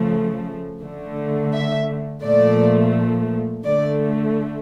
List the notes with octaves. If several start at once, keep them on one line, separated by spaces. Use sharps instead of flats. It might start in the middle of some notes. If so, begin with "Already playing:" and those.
Already playing: C#3 F3 A3
D3 A3
E5
A#2 F3 A3 D5
D3 A3 D5